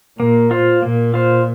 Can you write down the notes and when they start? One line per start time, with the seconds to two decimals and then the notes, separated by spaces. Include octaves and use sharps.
0.19 A#2 A#3
0.51 F4 C5
0.82 A#2 A#3
1.14 F4 C5